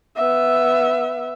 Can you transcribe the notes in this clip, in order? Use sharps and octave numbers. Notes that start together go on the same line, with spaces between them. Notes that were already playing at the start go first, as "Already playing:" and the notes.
B3 E5